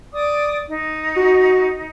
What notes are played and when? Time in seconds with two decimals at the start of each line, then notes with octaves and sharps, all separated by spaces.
0.13 D5 D6 D#6
0.69 D#4
1.16 F#4